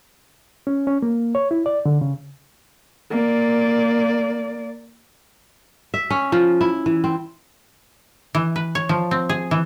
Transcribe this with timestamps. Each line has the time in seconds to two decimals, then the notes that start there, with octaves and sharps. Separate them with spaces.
0.67 C#4
0.87 C#4
1.02 A#3
1.35 C#5
1.51 E4
1.66 D5
1.86 D3
2.01 C#3
3.10 A#3 D5
5.94 E5
6.10 C#4
6.32 F3
6.61 E4
6.86 E3
7.04 C4
8.35 E3
8.56 B4
8.75 C#5
8.89 F3
9.11 C4
9.29 G#4
9.51 E3